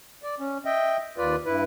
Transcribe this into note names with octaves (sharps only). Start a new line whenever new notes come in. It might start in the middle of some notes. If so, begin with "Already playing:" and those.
D5
C#4
D#5 E5 G5
D#2 F4 B4 D5
G2 E4 B4